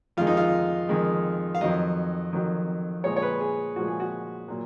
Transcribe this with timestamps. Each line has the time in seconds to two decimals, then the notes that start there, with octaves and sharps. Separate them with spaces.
0.17 F2 D#3 G#3 F4
0.27 D#4
0.37 F4
0.89 F2 D#3 G#3
1.55 F5
1.61 F2 D#3 F#3 D#5
2.33 F2 D#3 F#3
3.04 A#2 F3 G#3 C#5
3.16 C#5
3.22 B4
3.41 G#4
3.76 A#2 F3 G#3 F#4
3.88 G#4
4.00 F#4
4.48 A#2 F#3